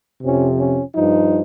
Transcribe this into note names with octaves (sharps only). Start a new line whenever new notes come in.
F2 C3 F3 C#4
C#4
G2 F3 D#4